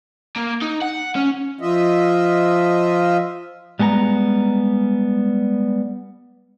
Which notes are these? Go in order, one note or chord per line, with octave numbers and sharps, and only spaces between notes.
A#3
D#4
F#5
C#4
F3 F4 D#5 E5
G3 G#3 B3 G#5 A#5